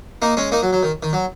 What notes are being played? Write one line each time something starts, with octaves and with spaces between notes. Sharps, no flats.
A#3 D#4
G#3 C#4
A#3 D#4
F#3
F#3
D#3
D#3
F#3